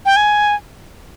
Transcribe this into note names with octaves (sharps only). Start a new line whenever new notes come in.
G5
G#5